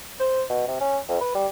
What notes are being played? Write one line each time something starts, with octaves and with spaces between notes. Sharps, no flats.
C5
B2
C3
C#4
F2
B4
G3